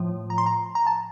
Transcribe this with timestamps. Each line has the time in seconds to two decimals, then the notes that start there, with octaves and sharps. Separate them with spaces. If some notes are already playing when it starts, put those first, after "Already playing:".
Already playing: A2 F3
0.30 A#5
0.38 C6
0.46 A#5
0.75 A#5
0.87 A5